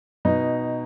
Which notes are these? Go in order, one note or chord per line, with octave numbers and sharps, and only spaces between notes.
B2 D#4